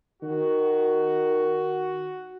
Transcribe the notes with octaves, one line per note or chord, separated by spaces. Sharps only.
D#3 F#4